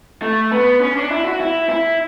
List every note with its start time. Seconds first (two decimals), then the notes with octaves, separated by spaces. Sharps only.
0.22 A3
0.52 B3
0.81 C#4
0.96 D4
1.11 E4
1.25 F#4
1.40 E4
1.69 E4